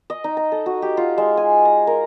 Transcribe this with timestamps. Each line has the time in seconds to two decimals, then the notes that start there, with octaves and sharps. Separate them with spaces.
0.10 D#5
0.24 D#4
0.37 A#5
0.52 A4
0.66 F#4
0.82 G4
0.97 F4
1.18 G#3
1.37 G#5
1.65 A#5
1.87 A#4